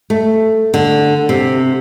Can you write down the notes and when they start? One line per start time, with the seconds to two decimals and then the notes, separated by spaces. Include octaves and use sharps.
0.10 A3
0.74 D3
1.29 C3